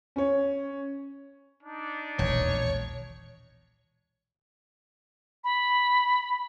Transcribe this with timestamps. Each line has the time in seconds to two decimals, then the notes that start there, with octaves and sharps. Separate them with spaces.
0.16 C#4 C#5
1.63 D4 D#4
2.19 E1 A#1 D#2 C#5
5.44 B5